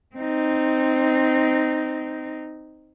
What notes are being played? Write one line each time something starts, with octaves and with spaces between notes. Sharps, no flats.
C4 D#4